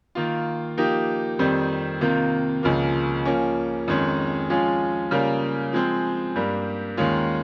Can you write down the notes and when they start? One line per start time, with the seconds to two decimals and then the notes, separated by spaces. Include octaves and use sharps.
0.15 D#3 A#3 F4
0.77 F3 A#3 D#4 G4
1.39 F2 D#3 G3 C4
2.01 C3 D#3 A#3 F4
2.63 C#2 C#3 F3 A#3
3.25 F3 A#3 C#4
3.88 F2 D#3 G#3 C#4
4.49 F3 G#3 C#4 F4
5.11 C#3 G3 A#3 F4 A#4
5.73 F3 G#3 C4
6.36 G2 G3 A#3
6.97 D#2 D#3 G#3 C#4 F4